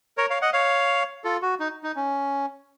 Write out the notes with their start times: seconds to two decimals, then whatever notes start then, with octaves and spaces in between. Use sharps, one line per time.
0.17 A#4 C#5
0.30 C#5 F5
0.42 D#5 F#5
0.53 C#5 F5
1.24 F4 A4
1.42 F#4
1.60 D#4
1.83 D#4
1.96 C#4